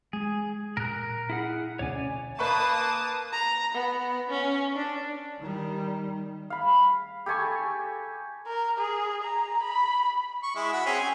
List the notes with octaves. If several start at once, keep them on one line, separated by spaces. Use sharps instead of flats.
G#3 G#4
A#2 A#4 F#6
E4 G#4 F#5
D2 B2 C#4 C#5 D5 G#5
A#3 B4 A5 B5 C#6 D#6
A#5
B3
C#4
D4
D#3 G3
F5 B5
G4 A4 G#5 C#6
A#4
G#4
A#5
B5
C#6
G#3 E4
F#4 B5
C4 C#4 G#4
G#5